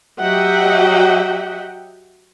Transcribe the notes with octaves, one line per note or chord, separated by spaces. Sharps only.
F#3 G4 D#5 E5 F#5 G5